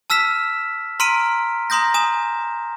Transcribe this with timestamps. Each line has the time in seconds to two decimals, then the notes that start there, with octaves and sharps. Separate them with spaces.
0.10 A5 E6 F6 B6 E7
1.00 A#5 C6 F6 B6 D7 D#7
1.70 A#5 C6 D#6 G6 A#6
1.94 G#5 D#6 E7